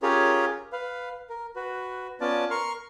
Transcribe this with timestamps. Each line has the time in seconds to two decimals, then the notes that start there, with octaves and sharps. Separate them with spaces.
0.02 C#4 F4 G4 G#4 A#4 C#5
0.72 B4 F5
1.29 A#4
1.56 F#4 B4
2.21 B3 C#4 F4 D5 A5
2.51 A#4 C6 C#6 F6